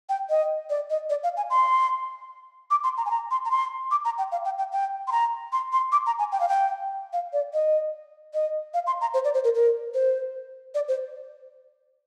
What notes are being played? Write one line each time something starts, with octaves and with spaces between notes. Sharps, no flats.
G5
D#5
D5
D#5
D5
F5
G#5
C6
D6
C6
A#5
G#5
A#5
C6
A#5
C6
D6
A#5
G5
F5
G5
G5
G5
C6
A#5
C6
C6
D6
A#5
G#5
G5
F5
G5
F5
D5
D#5
D#5
F5
C6
A#5
C5
D5
C5
A#4
A#4
C5
D5
C5